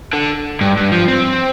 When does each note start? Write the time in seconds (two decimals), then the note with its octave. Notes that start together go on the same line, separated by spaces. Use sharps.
0.13 D3
0.61 G2
0.77 G2
0.92 F3
1.08 C4